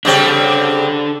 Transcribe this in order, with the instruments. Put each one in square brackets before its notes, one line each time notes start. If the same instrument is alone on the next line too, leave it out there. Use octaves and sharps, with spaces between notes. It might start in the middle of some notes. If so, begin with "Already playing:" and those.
[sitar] C#3 G3 C4 [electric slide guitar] D4 A4